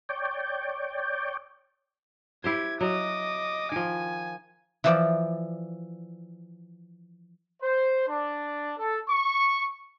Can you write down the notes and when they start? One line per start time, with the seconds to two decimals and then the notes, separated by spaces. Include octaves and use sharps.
0.09 C#5 D5 G5
2.44 E4 G4 C5 G#6
2.81 F#3 D#5 D6
3.72 D#3 F3 G#5
4.84 E3 F3 D5
7.62 C5
8.07 D4
8.77 A4
9.08 C#6